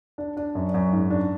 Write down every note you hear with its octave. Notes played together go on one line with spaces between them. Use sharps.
D4
D4
F#2
F#2
G#2
D4